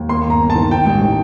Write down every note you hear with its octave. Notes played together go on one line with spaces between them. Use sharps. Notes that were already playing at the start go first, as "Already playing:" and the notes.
Already playing: D#2
A#3 C6
G1
A#5
G1
A5
D#3
D#3 G5
A1
D#3